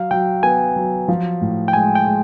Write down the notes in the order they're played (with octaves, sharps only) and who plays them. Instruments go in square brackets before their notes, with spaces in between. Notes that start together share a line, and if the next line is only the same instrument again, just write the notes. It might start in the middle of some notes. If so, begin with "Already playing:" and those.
Already playing: [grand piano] F#3 [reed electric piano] F5
[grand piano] F#3 [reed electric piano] G5
[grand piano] B3 [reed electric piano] G#5
[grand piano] F#3
F3
A2
[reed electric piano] G5
[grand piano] G#3 [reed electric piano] G#5
[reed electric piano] G5
[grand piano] G#3